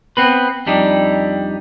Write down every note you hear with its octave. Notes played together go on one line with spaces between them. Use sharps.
B3 C4 B4
F2 G3 D4 D#4